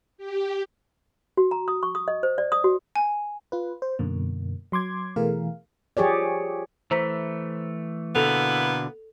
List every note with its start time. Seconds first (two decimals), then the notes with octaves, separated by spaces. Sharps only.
0.18 G4
1.37 F#4
1.51 A#5
1.68 D#6
1.83 C#6
1.95 D#6
2.08 D#5
2.23 C5
2.38 D5
2.52 D#6
2.64 F#4
2.96 G#5
3.52 F4 B4
3.82 C5
3.99 F#2 B2 D3 A#3
4.72 F#3 C6 D6 G#6
5.16 B2 E3 A3 G#4 A#4 F5
5.97 F3 G4 G#4 C#5 D5
6.91 E3 A3 C5 A#5 B6
8.16 B2 D3 A#3 B3 E4 A4 F7